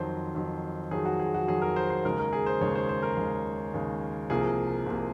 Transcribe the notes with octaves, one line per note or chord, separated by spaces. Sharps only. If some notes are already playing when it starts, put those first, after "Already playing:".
Already playing: F2 D#3 F#3 C5
F2 D#3 F#3
F2 D#3 F#3 G#4
F#4
G#4
F#4
F2 D#3 F#3 G#4
A#4
C5
C5
D#2 C#3 G#3 A#4
A#4
G#4
C5
D#2 C#3 G#3 C#5
C5
C5
A#4
D#2 C#3 G#3
D#2 C#3 G#3
C2 C3 F3 A#3 G#4
C2 C3 F3 A#3